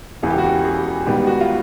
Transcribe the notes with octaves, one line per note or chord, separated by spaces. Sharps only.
E1 E2 C#3 E3 G#4
G4
F#4
G4
G#4
G#2 D#3 G3 B3 G4
F#4
F4